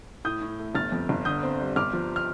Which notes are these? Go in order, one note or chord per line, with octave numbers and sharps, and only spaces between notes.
A2 D#6 G6
A2
A3
G1 F6 A6
F2
G1
D3 D#6 G6
C4
G3
G1 D6 F6
F3
F6